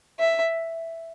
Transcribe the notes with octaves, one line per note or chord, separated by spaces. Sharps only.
E5